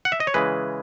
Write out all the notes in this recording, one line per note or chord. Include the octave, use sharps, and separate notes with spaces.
F#5
E5
D#5
C#5
C#3 E3 G#3 B4